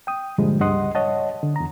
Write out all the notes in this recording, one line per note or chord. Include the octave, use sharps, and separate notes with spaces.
G5 D#6
G2 A#2 D3 F3 G3 G#3
C#2 G2 D#5 F#5 C6 D#6
C#5 D#5 F#5 A5
D3
E2 A#5